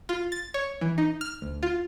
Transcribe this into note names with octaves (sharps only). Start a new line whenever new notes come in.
F4
A6
C#5
E3
D#4
F6
D2
F4